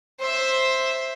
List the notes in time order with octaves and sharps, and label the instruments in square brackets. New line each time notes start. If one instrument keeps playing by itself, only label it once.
[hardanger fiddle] C5 E5